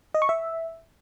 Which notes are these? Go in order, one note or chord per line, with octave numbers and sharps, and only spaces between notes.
D#5
C#6
E5